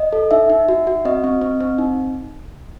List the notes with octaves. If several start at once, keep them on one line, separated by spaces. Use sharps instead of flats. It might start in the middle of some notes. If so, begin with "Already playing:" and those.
Already playing: D#5
A4
D#4 E5
D#4
F#4
F#4
C4 D#5
C4
C4
C4
D#4